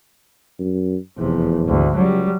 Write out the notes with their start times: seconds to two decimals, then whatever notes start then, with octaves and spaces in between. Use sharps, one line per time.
0.59 F#2
1.18 F1 E2 C3
1.67 D2 G#2
1.96 C#2 F#3 G3